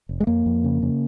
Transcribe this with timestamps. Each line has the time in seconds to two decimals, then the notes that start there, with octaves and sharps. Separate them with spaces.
0.09 F1
0.20 G#3
0.27 F2 A#3
0.46 F2
0.64 C#3
0.82 C#3